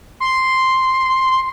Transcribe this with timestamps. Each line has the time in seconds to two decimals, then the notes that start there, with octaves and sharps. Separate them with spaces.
0.20 C6